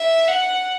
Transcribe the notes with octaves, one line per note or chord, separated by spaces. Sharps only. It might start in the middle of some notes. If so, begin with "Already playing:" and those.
Already playing: E5
F#5